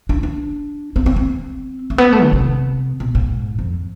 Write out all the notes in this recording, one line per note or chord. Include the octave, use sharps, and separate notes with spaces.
D4
D4
C4
C4
C4
A3
B3
A3
D3
C3
B2
G#2
F2